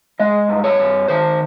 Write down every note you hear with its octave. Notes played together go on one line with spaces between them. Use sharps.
G#3 D#5
G2
C#5
G2
D#3 C5